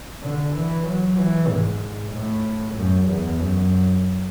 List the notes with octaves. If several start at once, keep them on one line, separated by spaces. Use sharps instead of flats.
D3
E3
F#3
E3
G#2
A2
F#2
E2
F#2